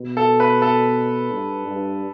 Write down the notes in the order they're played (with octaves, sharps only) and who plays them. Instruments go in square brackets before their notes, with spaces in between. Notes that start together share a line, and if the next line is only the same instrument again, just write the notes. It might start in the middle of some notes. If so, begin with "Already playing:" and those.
Already playing: [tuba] B2
[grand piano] A4
B4
A4
[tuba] G2
G2